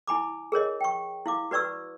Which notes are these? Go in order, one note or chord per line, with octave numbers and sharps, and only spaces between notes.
E4 G#5 B5 D6
G#4 A#4 C#5 D#5
G5 C#6
E4 F5 D6
F#4 B4 D5 C#6 E6